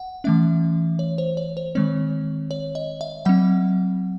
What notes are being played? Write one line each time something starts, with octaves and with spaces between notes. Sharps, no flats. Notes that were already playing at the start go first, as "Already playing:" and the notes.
Already playing: F#5
E3 A3 C#4 E5
C#5
C5
C#5
C5
D#3 G#3 C4 C#5
C#5
D#5
E5
F#3 C4 F#5